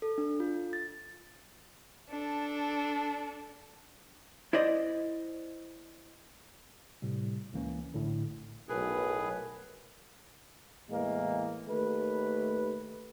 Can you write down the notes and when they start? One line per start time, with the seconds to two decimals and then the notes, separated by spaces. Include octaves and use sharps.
0.02 A4
0.18 D4
0.40 F4
0.73 A6
2.10 D4 A4
4.53 E4 C5 D5 D#5
7.02 A2 C3 G3
7.53 C#2 E3 A#3 C#4
7.94 A#1 A2 D3
8.69 B1 A2 G#4 A#4 B4
10.90 E2 A2 G#3 A#3
11.68 D#2 A3 B4